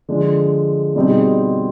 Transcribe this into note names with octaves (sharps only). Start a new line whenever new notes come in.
D3 F3 G#3
B2 G3 C4 D#4 G#4